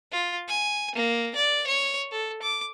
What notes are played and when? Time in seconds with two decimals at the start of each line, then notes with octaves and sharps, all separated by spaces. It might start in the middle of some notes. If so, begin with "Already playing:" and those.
0.12 F4
0.48 G#5
0.95 A#3
1.36 D5
1.67 C#5
2.12 A4
2.42 D6